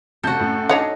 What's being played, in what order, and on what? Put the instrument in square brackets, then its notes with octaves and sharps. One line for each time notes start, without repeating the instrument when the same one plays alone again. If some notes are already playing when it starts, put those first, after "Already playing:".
[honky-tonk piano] F1 C3 G6 [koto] F#4 A4
[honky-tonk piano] F#2 A2
[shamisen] D4 C#5 F#5 [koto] D#4